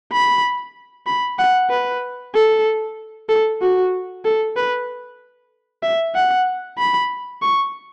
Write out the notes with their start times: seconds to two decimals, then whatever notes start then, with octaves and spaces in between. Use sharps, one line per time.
0.12 B5
1.06 B5
1.39 F#5
1.70 B4
2.35 A4
3.29 A4
3.62 F#4
4.25 A4
4.56 B4
5.83 E5
6.15 F#5
6.78 B5
7.42 C#6